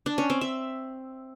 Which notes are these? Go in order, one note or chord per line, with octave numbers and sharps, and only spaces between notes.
D4
C#4
C4
E5